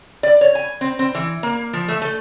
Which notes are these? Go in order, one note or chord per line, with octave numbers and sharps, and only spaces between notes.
D5
C#5
G#5
C4
C4
E3
A#3
F3
A3
A3